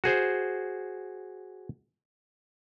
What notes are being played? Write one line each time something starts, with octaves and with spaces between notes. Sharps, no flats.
F#4 G#4 C5